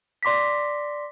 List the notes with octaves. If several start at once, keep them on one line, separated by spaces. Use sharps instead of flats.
D5 C6 D6 A#6 B6